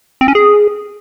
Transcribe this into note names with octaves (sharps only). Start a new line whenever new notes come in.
C4
C#4
G#4